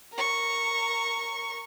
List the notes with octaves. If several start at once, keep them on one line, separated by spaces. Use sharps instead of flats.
A#4 C#6